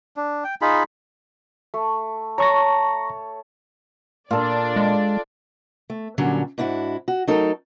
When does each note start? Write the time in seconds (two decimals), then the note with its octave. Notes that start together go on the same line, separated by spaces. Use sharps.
0.16 D4
0.44 G5
0.61 D#4 F4 G#4 B5
1.74 A3
2.38 C#5 A5 A#5 C#6 A#6
4.31 A#2 D4 F4 A4 D5
4.76 G#3
5.90 A3
6.18 A#2 D3 F#3 G3 C#4
6.58 G#2 D4 E4 F#4
7.08 F#4
7.27 F#3 A3 D#4 A4 A#4